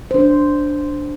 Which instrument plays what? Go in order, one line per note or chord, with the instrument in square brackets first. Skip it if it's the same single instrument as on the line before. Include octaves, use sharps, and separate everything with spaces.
[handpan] D4 C5